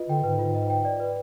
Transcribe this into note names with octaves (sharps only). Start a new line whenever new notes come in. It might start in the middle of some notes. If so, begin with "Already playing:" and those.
Already playing: F4 B4 D#5
D3 G5
G#2 B4
F4
D#5
G5
D5
B4